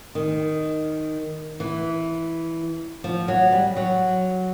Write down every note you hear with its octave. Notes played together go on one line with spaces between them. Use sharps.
D#3
E3
F3
F#3
G3
F#3